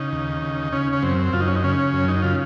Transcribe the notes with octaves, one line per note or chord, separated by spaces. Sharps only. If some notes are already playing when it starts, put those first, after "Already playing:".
Already playing: C#3 D#4
D#2
C#3
C#3 C#4
C#4
F#2 C4
F#2 F4
D#4
C#4
D#4
C#3 C#4
F#2
D#4
C#3 F4